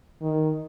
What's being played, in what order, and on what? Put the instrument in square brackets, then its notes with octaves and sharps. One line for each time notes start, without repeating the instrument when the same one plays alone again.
[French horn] D#3